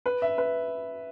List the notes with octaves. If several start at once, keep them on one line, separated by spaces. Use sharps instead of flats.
B4
E5
B4